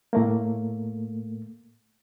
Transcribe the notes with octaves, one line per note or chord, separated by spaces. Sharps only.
A2 A3 A#3